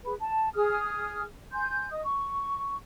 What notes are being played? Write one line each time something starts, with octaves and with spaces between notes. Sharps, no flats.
G#4 B4 B5
A5
G#4 D#6 F6
G#5 C6 G6
D#5 D#6
C#6